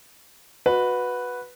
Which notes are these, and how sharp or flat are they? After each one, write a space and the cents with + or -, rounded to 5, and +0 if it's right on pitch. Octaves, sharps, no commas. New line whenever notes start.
F#4 -15 B4 +0 D#5 +0